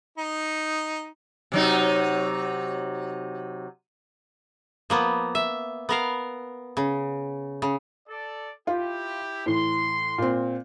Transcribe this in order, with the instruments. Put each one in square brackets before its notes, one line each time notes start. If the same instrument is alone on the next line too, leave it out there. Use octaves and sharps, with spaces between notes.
[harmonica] D#4
[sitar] C3 F#3 D#4
[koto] F3 A#3 B3
E5
B3 A#4 F5
C#3
C#3
[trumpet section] A4 D5
[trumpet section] E4 G4 [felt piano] F4
[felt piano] A2 E3 [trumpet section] C6
[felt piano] A#2 C4